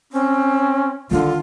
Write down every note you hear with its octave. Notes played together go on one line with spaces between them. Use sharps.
C4 C#4
D3 D#3 D4 F4